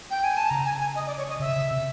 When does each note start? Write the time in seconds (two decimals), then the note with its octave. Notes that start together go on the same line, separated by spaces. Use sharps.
0.11 G5
0.24 G#5
0.37 A5
0.50 C#3 A#5
0.65 G#5
0.80 G#5
0.95 D#5
1.06 D5
1.17 C#5
1.29 D#5
1.40 C#3 E5
1.56 C#3
1.71 C3